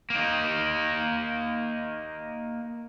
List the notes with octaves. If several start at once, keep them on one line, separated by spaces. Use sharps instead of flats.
A#3 D#4